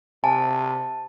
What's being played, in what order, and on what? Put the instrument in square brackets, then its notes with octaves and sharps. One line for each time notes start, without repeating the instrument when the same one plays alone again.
[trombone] C3 [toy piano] G#5 [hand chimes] A5